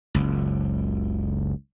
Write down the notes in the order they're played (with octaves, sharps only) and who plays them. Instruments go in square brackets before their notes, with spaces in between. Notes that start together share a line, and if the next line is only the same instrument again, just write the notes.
[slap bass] F#1 C#2